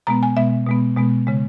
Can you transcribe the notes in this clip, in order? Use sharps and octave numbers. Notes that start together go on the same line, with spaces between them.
B2 G#3 B3 A#5
G#5
B2 G#3 B3 E5
B2 G#3 B3
B2 G#3 B3
C#3 G#3